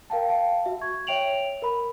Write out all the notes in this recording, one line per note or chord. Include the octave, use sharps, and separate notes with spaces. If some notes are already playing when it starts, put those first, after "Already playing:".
A#4 F5 G5 A5
F5 G5 A5
F#4 E5
C#6 G#6
C#5 E5 G5 D7 F7 F#7
A#4 B5